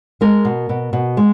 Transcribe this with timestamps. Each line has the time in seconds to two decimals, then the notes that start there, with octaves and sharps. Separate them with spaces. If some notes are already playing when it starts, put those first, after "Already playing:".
0.21 G#3 A#4
0.45 B2
0.69 B2
0.93 B2
1.17 G#3